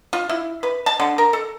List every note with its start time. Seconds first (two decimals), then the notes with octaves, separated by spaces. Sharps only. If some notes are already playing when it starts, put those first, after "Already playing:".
0.13 F4
0.29 E4
0.63 B4
0.86 A5
1.00 D3
1.18 A#4
1.33 A4